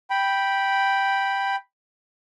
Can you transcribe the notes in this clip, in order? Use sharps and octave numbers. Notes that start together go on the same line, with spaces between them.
G5 B5